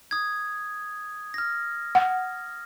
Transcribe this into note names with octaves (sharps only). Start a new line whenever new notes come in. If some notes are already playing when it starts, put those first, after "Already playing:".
D#6 G#6
F6 A#6
F#5